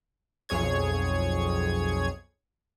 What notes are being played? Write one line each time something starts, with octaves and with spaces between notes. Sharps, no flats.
B1 F2 G#4 C#5 G#6